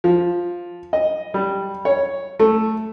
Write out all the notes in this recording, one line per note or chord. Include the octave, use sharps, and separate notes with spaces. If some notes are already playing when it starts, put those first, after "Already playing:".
F3
D#5
G3
C#5
A3